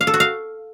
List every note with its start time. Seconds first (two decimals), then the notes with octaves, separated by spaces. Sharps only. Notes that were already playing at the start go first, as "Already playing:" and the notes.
0.01 F5
0.07 A4
0.14 F#4
0.20 F5